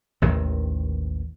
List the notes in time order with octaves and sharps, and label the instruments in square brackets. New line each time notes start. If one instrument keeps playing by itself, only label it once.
[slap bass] A1 D#2 C3 D#3